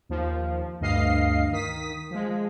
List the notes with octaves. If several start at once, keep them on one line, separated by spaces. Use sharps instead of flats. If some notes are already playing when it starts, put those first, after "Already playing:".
D#2 F3
D2 G2 D#5 F5 C7
D#3 D#6 B6
F3 G#3